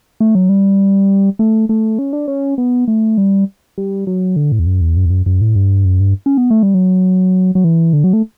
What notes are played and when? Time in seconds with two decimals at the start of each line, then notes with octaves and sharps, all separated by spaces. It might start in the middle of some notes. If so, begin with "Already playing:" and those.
0.20 A3
0.35 F#3
0.49 G3
1.39 A3
1.69 A3
1.99 C#4
2.13 D4
2.28 C#4
2.58 B3
2.88 A3
3.18 G3
3.78 G3
4.07 F#3
4.36 D3
4.52 A2
4.59 E2
4.66 F#2
4.81 E2
4.97 F#2
5.06 E2
5.10 F#2
5.26 F#2
5.41 A2
5.55 G2
5.85 F#2
6.00 G2
6.26 C#4
6.37 B3
6.50 A3
6.63 G3
6.74 F#3
7.55 F#3
7.64 E3
7.93 D3
8.04 F#3
8.13 A3